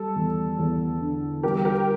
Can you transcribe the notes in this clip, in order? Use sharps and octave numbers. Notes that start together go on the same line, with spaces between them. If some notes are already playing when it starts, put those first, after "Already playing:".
Already playing: G3 A4
E2
E2
D3
G3 G4 A#4
G4 A#4